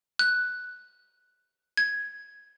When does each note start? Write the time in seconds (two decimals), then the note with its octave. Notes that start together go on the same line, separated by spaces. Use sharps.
0.19 F#6
1.77 G#6